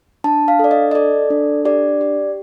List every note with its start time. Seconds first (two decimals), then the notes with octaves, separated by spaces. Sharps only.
0.24 D4 A5
0.48 F5
0.59 A4 D5
0.71 D#5
0.91 D#5
0.95 A4 D5
1.30 D4
1.65 G4 D5
2.01 G4